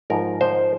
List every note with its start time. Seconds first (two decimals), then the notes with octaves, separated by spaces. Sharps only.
0.10 G#2 F3 G#3 A#4
0.41 C5